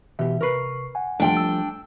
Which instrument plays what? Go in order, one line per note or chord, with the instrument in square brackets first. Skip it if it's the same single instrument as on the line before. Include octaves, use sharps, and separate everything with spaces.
[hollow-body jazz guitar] B2 G4 [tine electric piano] E3 E5
[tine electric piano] C3 C#6 C7 [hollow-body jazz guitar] A#4 B4
[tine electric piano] F#5 G#5
[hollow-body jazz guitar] F3 G3 A3 [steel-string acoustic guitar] D4 G5
[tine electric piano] E6